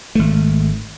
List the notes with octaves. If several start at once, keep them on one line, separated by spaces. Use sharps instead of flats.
G#1 A3